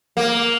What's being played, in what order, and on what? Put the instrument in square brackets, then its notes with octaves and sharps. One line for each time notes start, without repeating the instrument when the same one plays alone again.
[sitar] A#3